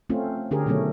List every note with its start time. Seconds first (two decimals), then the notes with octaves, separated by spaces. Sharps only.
0.10 A3 C4 C#4 F4
0.51 D3 C#4 G4 G#4 A#4
0.66 B2 D#3 F#3 A3 C#4